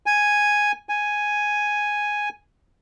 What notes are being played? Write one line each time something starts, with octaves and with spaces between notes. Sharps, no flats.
G#5
G#5